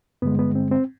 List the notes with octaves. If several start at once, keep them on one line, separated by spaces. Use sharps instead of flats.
G2 D3 G#3 B3
B3
C4
C4